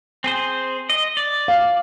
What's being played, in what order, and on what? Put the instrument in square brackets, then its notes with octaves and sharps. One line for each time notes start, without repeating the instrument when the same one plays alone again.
[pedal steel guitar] C4 G#4 C5
D#5
D5
[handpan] F5